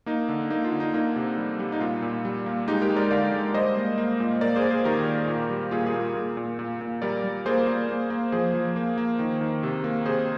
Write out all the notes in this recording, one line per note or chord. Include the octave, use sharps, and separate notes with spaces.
A#3 D#4
D3
A#3 D#4
F4
D3
D#4
A#3 D#4
C3
G3
G3
D#4
A#2 F4
A#2
G3
A#3
G#3 D#4 G4
G4 A#4
G#3
A#4 D5
D3 D5 F5
G#3
G3 C5 D#5
A#3
A#3
A#2
A#3 A#4 D5
G#4 C5
A#3
G#4 C5
D#3 G4 A#4
A#3
A#2
G3
A#2 F4 G#4
F4 G#4
A#2
A#2
A#2
A#2
A#2
G3 A#4 D5
G3
A#3 G#4 C5
A#3
A#3
A#3
F3 G#4 C5
F3
A#3
A#3
D#3
D#3
C3
A#3
C3 G#4 C5